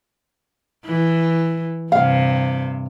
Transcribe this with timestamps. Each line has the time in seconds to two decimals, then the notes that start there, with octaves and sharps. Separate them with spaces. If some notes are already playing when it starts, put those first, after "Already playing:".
0.86 E3
1.92 G2 C3 F5